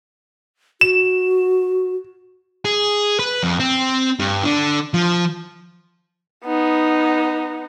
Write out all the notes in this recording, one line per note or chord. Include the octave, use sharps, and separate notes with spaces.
F#4 E7
G#4
B4
F2
C4
G2
D3
F3
B3 D#4